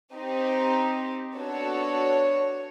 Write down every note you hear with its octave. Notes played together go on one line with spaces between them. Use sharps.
C4 D#4 G4
B3 D4 F#4 A4 C#5